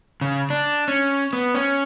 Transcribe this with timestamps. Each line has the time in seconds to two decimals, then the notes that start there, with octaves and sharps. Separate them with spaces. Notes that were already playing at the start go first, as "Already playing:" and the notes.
0.21 C#3
0.50 D4
0.88 C#4
1.33 B3
1.55 C#4